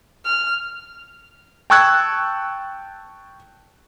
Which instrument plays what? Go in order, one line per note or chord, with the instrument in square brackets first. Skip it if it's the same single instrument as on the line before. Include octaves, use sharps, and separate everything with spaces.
[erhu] F6
[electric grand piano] G5 A5 C#6 E6 F#6 G#6